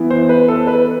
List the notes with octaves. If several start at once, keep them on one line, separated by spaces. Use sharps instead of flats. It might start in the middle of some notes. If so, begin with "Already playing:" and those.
Already playing: E3 B3
C5
B4
A4
B4